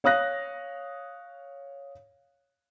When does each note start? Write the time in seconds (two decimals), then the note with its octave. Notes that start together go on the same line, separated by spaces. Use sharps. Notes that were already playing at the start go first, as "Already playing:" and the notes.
0.04 C#5 F5 D#6 F#6 A#6